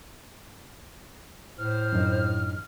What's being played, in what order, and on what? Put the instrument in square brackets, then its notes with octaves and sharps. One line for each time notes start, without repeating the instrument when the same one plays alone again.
[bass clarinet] A2 [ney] C5 [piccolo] F6
[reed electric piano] F#2 D4 D#4